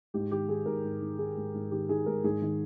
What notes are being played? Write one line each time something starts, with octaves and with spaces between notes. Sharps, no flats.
G#2 G4
D#3 G4
D#3 G#4
G#2 A#4
G#2
D#3
D#3 G#4
G#2
G#2
D#3 G4
D#3 G#4
G#2 A#4
G#2 G#4
D#3